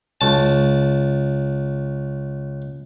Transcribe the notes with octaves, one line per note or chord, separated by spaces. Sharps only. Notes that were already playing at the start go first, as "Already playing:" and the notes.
C#2 A5